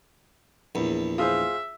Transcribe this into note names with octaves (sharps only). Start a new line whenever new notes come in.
A#1 E2
F4 G#4 C5 E5